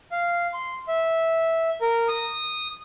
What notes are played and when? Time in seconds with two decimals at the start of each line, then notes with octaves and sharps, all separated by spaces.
0.12 F5
0.53 C6
0.88 E5
1.81 A#4
2.08 D#6